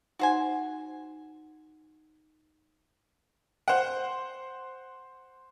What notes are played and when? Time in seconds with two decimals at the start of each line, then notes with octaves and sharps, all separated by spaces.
0.19 D#4 F#4 C5 F#5 G#5
3.68 C5 F#5